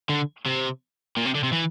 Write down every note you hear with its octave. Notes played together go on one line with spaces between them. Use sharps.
D3
C3
A#2
C3
D3
C3
E3